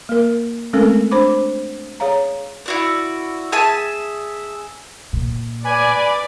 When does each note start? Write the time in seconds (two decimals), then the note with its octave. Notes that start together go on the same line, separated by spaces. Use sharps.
0.09 A#3 A#4
0.73 G#3 A3 C4 C#4 A4 A#4
1.11 D4 C5 B5 D6
2.00 G#4 C#5 F5 A#5
2.66 E4 F#4 D5
3.52 G#4 E5 G#5 A5
5.13 A#2
5.64 B4 D5 G#5 B5